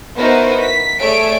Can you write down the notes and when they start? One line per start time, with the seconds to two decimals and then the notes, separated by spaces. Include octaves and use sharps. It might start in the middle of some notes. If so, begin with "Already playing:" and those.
0.17 B3 D#4 E4 F#4 A#4 C5
0.61 B6
1.00 A3 G#4 C#5 D5 E5 D7